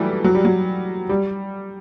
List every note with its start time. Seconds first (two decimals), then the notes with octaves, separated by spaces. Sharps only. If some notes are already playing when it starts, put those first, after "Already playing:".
Already playing: E3 F#3 G3 A3
0.24 F#3
0.35 G3
0.45 F#3
1.09 G3